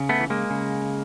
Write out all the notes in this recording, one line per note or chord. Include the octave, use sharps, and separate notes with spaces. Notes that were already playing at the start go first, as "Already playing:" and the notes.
Already playing: C#3
A3 B3
E3
G#3 A#3
C#3